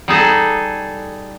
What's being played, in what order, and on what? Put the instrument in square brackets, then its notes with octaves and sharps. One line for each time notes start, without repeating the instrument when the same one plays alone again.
[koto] G3 D#4 G#4 A4